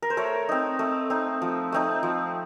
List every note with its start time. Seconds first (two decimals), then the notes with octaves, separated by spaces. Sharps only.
0.02 A#4
0.10 C5
0.17 A3 A#4 C#5
0.49 C4 D#4
0.79 A3
1.10 C4 D#4
1.42 F3
1.72 A3 C4 D#4
2.03 F3